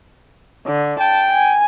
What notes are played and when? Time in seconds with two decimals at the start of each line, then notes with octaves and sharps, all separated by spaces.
0.67 D3
1.00 G5 A5
1.33 G#5